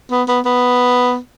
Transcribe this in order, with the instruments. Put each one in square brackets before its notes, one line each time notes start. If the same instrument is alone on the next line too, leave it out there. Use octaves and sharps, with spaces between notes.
[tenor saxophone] B3
B3
B3